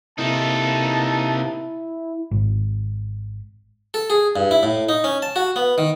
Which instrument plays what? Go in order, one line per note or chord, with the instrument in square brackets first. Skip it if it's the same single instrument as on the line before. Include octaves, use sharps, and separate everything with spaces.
[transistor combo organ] C3 A#3 [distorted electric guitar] D#4 A4 [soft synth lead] E4 [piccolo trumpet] A5
[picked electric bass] G#1
[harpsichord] A4
G#4
G2
E4
A2
D#4
C#4
A5
F#4
B3
D#3